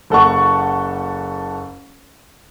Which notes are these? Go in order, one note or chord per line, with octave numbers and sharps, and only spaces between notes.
F#1 A4 F#5 C#6